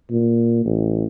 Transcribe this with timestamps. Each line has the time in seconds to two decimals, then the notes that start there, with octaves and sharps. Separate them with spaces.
0.11 A#2
0.65 A1